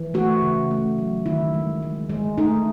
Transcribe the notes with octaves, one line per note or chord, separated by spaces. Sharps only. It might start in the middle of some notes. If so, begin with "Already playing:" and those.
Already playing: E3
A3 F#4
C#3
A3
F#3
D#3 E4
G#3
G#3
G#3
A3 D#4